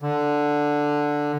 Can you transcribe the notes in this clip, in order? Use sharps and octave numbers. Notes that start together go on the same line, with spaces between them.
D3